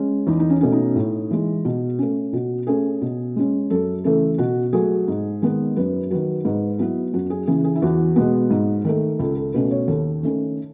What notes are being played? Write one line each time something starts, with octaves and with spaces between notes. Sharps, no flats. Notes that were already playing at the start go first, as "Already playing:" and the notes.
Already playing: G#3 C#4
E2 D#4
D#4
C#4
B2 A3 C#4
D#4
A2
E3 G#3
B2
A3 C#4
B2 F#4
A3 C#4 G#4
B2
G#3 C#4
F#2 A4
C#3 E3 A3 A4
B2 F#4
F#3 A3 G#4
G#2
D#3 G#3 B3
F#2 B4
D#3 F#3 B4
G#2 B4
F#3 B3 E4
F#2 F#4
G#4
C#3 E3 G#4
G#4
E4
E2 F#4
B2 G#3 B3
G#2
D#3 A3
C#2 A4
A4
B2 A3 C#4 B4
C#5
D#2 A4
D#3 A3 C#4